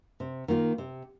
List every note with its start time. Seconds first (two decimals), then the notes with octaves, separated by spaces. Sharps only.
0.20 C3
0.48 D#3 A#3 F4
0.78 C3